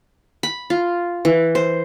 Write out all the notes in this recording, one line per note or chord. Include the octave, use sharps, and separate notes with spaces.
B5
F4
E3
C5